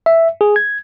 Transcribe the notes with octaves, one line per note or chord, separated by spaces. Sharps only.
E5
G#4
G#6